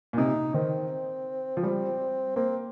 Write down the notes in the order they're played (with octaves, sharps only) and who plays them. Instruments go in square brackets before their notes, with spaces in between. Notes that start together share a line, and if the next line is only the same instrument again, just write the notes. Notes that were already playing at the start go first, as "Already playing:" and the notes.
[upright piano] A#2
[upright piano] C3 [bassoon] D#4
[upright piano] D#3 [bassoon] C4
[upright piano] F3
G3
[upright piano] A#3 [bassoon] C4